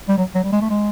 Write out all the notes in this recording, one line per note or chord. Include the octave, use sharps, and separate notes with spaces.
G3
F#3
F#3
G3
G#3
A3
G#3